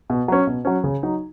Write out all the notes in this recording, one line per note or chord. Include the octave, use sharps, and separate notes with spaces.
B2
F#3 C#4
B2
F#3 C#4
C#3
F#3 D#4